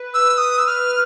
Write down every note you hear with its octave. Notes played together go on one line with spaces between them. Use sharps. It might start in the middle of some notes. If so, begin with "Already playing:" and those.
Already playing: B4
E6
D#6
E6
F6